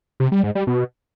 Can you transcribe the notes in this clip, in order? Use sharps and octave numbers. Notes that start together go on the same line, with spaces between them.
C3
G3
G#2
G3
B2